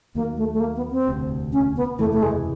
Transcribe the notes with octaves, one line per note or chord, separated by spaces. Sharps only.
D#2 D#3 F#3 A#3
A3
A3
A#3
B3
C4
E1 D2 C3
C#4
B3
F#1 E2 C3 E3 A3
A3
G#3